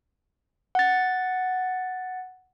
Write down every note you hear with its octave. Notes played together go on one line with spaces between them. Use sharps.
F#5 A6